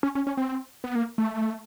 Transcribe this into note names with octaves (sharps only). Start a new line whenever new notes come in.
C#4
C#4
C#4
C4
B3
A#3
A3